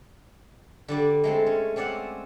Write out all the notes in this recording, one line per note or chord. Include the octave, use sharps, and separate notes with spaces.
D3 G3 D5
G#3 A3 C4
C#4
C4 C#4 D5 E5 F#5